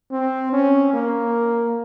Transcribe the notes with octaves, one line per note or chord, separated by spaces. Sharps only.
C4
C#4
A#3